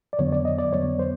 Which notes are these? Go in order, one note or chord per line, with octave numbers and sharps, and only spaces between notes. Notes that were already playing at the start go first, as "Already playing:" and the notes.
D5
F2 D3 F#3 B3 C#5
D5
D#5
D5
F2 D3 F#3 B3 C#5
C5